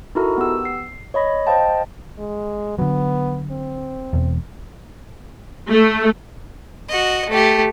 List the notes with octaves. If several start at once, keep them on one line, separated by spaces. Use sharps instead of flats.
D#4 E4 F#4 A4 A#4 A#5
B3 G4 E6
C7
C#5 D#5 B5 A#6
C5 D#5 F5 G5 A5
G#3
D3 F#3 B3
C4
E1 E2
A3
F#4 D#5
A3 G4